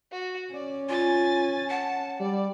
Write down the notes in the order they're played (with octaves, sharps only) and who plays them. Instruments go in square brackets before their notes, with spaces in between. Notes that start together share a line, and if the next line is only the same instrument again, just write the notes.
[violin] F#4
[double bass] C#4 [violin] D5
[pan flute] F4 [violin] G#5 A6
[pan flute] F#5 [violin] A5
[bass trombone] G3 [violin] D5